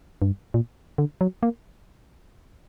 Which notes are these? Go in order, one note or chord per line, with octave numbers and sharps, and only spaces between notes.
G2
A#2
D3
F#3
A#3